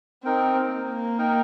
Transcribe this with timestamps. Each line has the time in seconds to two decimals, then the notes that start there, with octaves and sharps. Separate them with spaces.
0.24 C4 D#4 A#4 G5
0.71 A#3
1.18 D#4 A#4 G5